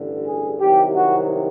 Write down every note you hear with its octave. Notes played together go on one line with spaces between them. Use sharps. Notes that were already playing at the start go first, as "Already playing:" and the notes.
Already playing: A1 G2 D3
G#4
C2 C3 D#3 F#3 G4
F#4